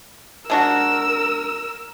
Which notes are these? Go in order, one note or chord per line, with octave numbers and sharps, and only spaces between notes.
G#3 D4 F#4 A#4 E6